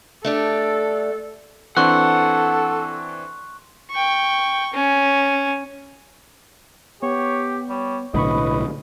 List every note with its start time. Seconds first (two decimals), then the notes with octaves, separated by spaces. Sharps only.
0.25 A3 D4 G4 A4
1.77 E3 C4 D4 A4 F#5 C6 C#6 F#6
3.90 G5 C#6
4.73 C#4
7.03 B3 G4 C#5
7.70 G3 C#5
8.14 B1 A2 D3 E4 B4 D#5 B5 C#6